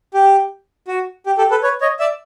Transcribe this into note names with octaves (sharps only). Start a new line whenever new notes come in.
G4
F#4
G4
G4 A4
A4 B4
B4 C#5
C#5 D#5
D5 E5